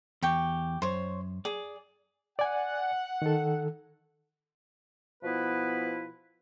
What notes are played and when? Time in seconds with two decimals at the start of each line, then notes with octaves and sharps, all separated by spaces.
0.23 E2 G4 G5 C#6
0.82 F#2 C5 C#5
1.45 G#4 D5
2.39 D5 F#5 G#5
3.22 D#3 A4
5.22 B2 F3 B3 E4 B4